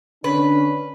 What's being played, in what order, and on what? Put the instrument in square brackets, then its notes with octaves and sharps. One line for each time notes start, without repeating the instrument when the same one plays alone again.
[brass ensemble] D3 C#4 D4 [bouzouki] B4